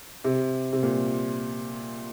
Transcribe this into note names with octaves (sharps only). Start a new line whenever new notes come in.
C3
C3
A#2